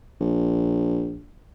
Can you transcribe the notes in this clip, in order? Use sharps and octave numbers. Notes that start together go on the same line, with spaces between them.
A#1